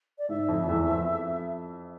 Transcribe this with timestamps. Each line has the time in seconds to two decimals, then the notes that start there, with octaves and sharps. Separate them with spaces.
0.18 D5
0.29 G#2 E5
0.48 F2
0.64 F2
0.68 E2
0.89 F2